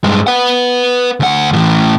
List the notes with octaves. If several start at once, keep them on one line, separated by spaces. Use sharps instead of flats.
G2 G#3
B4 F#5
D2 F#5
A2 E3